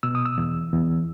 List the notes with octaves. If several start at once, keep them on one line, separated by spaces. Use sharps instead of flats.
B2 E6
D#6
E6
E2
E2